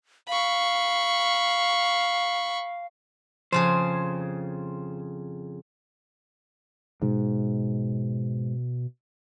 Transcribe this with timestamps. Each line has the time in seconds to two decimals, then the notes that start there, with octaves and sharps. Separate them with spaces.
0.28 F5 B5 C#6
3.52 F2 C#3 G#4 C5
7.02 G#2 B2